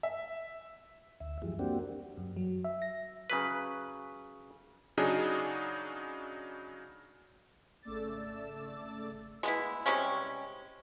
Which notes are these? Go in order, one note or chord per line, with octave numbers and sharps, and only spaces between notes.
E5
D2 E5
F#2 E3 F3 G3 G#3
A#3 C4 D4 F#4 G4
F#2
F#3
E5
A#6
C#3 F#3 B4
C#3 F#3 D4 D#4 F#4 G#4
G#1 C#3 A3 D5 E6 A6
G#3 B3 E4
C3 G3 G#3 C#4